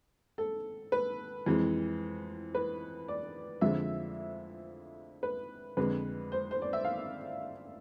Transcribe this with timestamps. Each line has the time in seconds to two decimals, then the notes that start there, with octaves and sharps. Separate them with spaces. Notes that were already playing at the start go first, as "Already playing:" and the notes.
0.38 A4
0.92 B4
1.46 F2 E3 G#3
2.55 B4
3.08 D5
3.61 F2 D3 F3 G#3 E5
5.23 B4
5.77 F2 D3 G#3 B4
6.32 C5
6.51 C5
6.62 D5
6.73 E5
6.84 F5